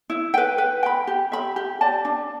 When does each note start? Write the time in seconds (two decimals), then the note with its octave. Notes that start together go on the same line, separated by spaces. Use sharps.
0.10 E4
0.34 B4 G5
0.58 B4
0.83 G5 B5
1.07 G4
1.32 E5 B5
1.56 G4
1.81 D5 A5
2.05 D4